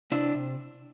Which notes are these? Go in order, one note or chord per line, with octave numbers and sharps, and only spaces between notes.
C3 D4 E4
C3